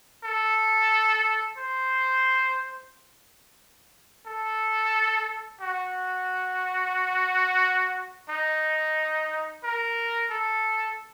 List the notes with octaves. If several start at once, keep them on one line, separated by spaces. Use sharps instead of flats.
A4
C5
A4
F#4
D#4
A#4
A4